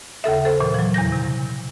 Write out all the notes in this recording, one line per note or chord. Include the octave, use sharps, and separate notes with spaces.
D#2 C#3 A4 E5
A4 C5
A#2 E3
F3 F#3
E2 C#3 G6 A#6
C3